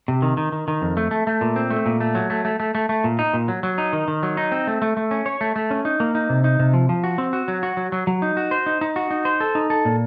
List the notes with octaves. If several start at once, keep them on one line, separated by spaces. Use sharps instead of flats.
C3
D#3
D#3
D#3
D#3
F2
A3
A3
A3
A#2
C4
A3
A#2
A3
F#3
A3
A3
A3
A3
A3
A#2
D#4
A#2
F#3
F#3
D#4
D#3
D#3
F#3
D#4
C4
A3
A3
A3
C#4
C#5
A3
A3
C#4
D#4
A#3
D#4
C3
D#4
C3
F3
F3
F#4
C4
F#4
F#3
F#4
F#3
F#3
F#3
D#4
F#4
C5
D#4
D#4
F#4
D#4
C5
A4
D#4
A4
A#2